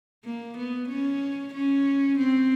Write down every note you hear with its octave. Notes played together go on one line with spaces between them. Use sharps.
A#3
B3
C#4
C#4
C4